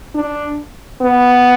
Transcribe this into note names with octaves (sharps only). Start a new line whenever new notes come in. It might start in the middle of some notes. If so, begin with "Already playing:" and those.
D4
B3